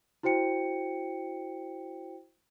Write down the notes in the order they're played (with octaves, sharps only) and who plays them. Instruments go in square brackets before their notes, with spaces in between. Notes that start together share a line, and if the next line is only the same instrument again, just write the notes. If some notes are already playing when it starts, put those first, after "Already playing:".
[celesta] E4 F#4 C5 G5 C#7